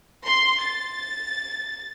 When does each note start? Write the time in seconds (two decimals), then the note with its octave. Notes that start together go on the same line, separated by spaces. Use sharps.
0.24 C6
0.61 A6